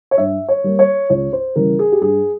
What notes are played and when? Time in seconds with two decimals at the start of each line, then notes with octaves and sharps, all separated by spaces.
0.11 C#5
0.18 G2 E5
0.48 C#5
0.64 G3 A#3
0.79 C#5
1.10 C#2 C#5
1.33 C5
1.56 C#3 E3 G3 A#4
1.79 G#4
1.92 G4
2.02 G2 G#4